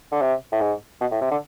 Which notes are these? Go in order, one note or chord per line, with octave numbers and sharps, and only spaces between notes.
D3
C3
A2
G#2
B2
A2
C3
D3